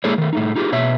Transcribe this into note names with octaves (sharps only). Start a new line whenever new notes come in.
G#3 A#3 E4 G#4 A4 C#5
D#3 A3
A2 A3 D#4
D#4 F4 G4 G#4
B2 C#5 E5